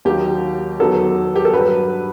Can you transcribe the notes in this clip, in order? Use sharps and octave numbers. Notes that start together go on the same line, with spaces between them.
D#2 D#3 F#3 G4
E2 D#3 F#3 A4
G4
A4
G2 F#3 B4